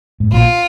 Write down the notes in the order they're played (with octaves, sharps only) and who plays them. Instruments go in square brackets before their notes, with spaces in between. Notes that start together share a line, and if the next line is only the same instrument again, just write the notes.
[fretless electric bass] G#2
[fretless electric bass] A#1 A#2 [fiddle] F4